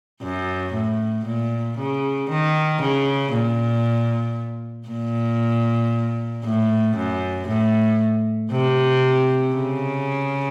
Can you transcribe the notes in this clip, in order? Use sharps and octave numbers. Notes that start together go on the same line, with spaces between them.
F#2
A2
A#2
C#3
D#3
C#3
A#2
A#2
A2
F#2
A2
C3
C#3